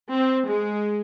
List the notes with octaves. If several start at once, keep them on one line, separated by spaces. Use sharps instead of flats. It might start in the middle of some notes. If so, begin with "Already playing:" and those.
C4
G#3